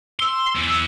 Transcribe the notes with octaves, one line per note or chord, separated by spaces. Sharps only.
C6 E6
E2 E3